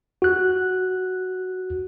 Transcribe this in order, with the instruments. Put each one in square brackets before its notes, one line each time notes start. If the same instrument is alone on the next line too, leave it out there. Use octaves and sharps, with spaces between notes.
[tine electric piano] F#4 F#6